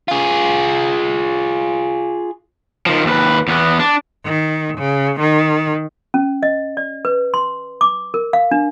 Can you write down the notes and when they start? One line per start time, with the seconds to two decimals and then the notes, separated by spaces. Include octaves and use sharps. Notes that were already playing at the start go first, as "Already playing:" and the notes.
0.08 F4 G#4
2.86 D#3 F3
3.05 D#2 B4
3.48 E2 B3
3.80 D4
4.25 D#3
4.78 C#3
5.20 D#3
6.14 C#4
6.43 D#5
6.77 D5
7.05 B4
7.34 C6
7.81 D6
8.14 A#4
8.33 F5
8.51 D4